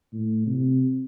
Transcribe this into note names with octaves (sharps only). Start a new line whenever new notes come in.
A2
C3